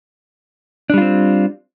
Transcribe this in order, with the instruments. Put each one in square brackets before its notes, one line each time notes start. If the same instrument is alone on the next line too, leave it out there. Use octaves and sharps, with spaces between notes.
[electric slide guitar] D4
G3
F4
C4